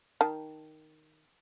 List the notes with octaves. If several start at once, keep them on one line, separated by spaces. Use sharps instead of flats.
D#3 A5